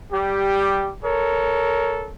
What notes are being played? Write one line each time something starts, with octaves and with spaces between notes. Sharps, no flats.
G3 G4
A4 A#4 C#5